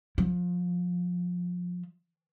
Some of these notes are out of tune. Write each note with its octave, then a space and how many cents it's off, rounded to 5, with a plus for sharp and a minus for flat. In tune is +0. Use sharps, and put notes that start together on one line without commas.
F3 +25